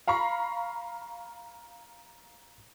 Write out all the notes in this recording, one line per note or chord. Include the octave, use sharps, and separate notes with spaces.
F5 A#5 B5 C#6